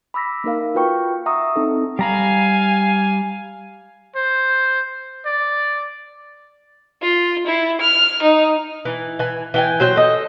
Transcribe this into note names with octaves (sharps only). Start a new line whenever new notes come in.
B5 D6 E6 A#6 B6
A#3 D#4 A#4 F5
F4 F#4 B4 G5 C#6
E5 F#5 A#5 C#6 D#6 E6
C4 D#4 A4
G3 F5 G#5 A#5 B5
C5
D5
F4
E4
F6
D#4
E3
E3 G#5
E3 G5 G#5
F#3 C5 G5
A4 D#5